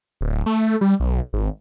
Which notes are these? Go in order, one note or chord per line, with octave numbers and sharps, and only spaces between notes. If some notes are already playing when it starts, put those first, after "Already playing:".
D1
A3
G3
B1
G#1